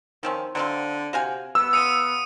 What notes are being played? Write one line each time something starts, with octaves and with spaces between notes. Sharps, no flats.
D#3 F3 C4 C#4
D3 F#3 C4 F4
C3 F#4 F5 G#5
B3 E6
C#3 F4 D#6 C#7 D#7